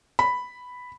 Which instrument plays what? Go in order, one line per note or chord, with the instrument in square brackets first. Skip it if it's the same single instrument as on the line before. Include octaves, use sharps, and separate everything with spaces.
[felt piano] B5